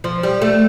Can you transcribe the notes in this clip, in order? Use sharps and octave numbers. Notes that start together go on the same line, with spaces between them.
F3
G3
A3